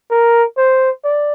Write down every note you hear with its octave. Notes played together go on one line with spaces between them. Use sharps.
A#4
C5
D5